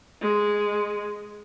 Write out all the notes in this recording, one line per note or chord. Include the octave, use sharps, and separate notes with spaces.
G#3